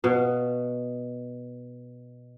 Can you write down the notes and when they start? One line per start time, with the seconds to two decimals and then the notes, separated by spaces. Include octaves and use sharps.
0.04 B2 F5